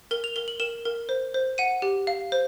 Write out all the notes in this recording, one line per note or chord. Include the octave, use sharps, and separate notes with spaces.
A#4 G7
F7
A#4 G7
F#7
A#4 E7
A#4
C5
C5
F#5 D#7
G4
F5
C5